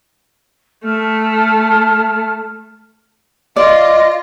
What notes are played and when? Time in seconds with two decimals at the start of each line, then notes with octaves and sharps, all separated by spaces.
0.84 A3 A5 F6
3.56 F4 D5 D#5